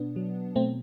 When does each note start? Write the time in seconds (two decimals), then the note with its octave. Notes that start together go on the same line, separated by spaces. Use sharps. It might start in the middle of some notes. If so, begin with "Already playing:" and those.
Already playing: B2 B3 D4
0.16 F#3
0.55 B2 A3 C4